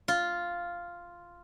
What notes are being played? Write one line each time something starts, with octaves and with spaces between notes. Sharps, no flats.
F4